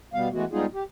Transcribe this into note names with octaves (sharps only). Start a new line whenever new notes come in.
B2 G3 B3 F5
E3 G#3 A3 B3 F#4
G3 G#3 B3 D#4 F4 G#4
G4